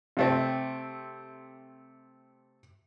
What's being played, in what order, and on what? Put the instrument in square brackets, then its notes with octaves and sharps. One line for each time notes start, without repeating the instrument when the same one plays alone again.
[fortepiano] C3 A3 C4